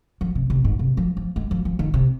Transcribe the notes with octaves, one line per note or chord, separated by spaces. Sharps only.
F3
C3
C3
G#2
C3
F3
F3
G#3
F3
F3
D#3
C3